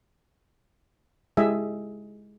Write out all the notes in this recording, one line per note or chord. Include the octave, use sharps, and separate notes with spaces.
G#3 E4 G4 D#5 E5 G#5